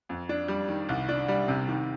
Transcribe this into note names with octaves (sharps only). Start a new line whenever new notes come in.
F2
D4
G3
D#3
C2
D4
G3
C3
D#3